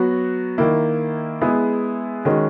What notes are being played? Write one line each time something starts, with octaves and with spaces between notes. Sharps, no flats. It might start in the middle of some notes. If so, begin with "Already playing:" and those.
Already playing: F#3 B3 F#4
D#3 A#3 E4
G#3 B3 E4 G#4
D#3 G#3 C#4 F#4